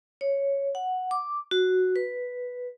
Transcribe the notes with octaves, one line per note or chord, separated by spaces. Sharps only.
C#5
F#5
D6
F#4
B4